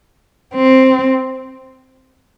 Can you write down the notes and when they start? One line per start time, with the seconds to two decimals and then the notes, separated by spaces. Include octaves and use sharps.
0.55 C4